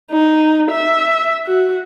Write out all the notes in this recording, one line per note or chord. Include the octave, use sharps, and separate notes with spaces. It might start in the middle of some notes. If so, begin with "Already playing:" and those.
D#4
E5
F#4